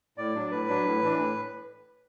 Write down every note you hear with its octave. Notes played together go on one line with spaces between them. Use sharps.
A2 D5
F#3 D4
A2 B4
F#3 D4
A2
E3 D4
A2